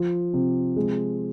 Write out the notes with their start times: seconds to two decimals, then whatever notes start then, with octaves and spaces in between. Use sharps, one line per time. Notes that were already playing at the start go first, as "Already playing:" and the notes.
Already playing: F3
0.34 C3
0.76 G#3